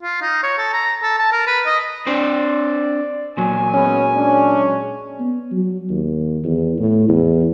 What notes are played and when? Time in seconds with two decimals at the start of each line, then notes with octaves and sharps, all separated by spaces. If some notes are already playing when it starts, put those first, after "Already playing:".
0.03 F4
0.22 D#4
0.43 C#5
0.58 A4
0.73 A#5
1.03 A4
1.18 A5
1.32 A#4
1.47 B4
1.66 D#5
2.07 C4 D4 C5 D5
3.37 A#2 F#3 G#5
3.74 G#3 B3 C#4
4.16 G#3 C#4 D4
5.19 B3
5.52 F#3
5.90 D#2
6.44 E2
6.79 A2
7.08 E2